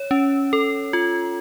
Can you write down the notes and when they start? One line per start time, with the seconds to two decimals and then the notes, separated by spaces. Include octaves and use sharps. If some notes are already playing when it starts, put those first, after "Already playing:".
Already playing: C#5
0.11 C#4
0.53 A4
0.93 F4